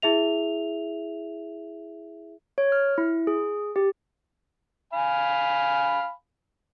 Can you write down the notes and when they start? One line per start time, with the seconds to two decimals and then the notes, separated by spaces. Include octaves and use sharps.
0.02 E4 G#4 E5 F7
2.58 C#5
2.72 F6
2.98 E4
3.27 G#4
3.76 G4
4.93 F5 G#5 B5